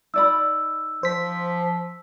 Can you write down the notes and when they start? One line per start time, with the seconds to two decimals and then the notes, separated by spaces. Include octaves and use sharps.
0.14 D#4 D5 B5 E6
1.03 F3 C5 B6